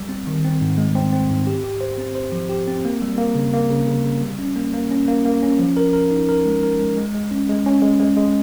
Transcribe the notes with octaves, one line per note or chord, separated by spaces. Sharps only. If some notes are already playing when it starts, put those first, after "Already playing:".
Already playing: G3
C4
D#3
C4
G#2
G#3
C4
C4
G#2
G4
G4
C5
C4
C5
F3
G4
C4
A#3
G3
A#3
C#3
A#3
C#3
C#3
C#3
G3
C#4
A#3
A#3
C#4
A#3
A#3
C#4
F3
A#4
A#4
D#4
A#4
G#3
A#4
G#3
G#3
G#3
C#4
G#3
C#4
G#3
G#3
G#3